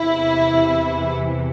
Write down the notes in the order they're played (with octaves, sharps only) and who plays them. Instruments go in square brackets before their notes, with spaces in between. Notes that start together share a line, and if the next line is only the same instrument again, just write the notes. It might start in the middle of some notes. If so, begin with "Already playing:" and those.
Already playing: [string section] E2 C3 E3 E4